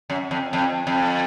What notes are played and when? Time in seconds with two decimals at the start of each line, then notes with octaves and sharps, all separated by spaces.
0.10 F#2
0.31 F2
0.53 F2
0.87 F2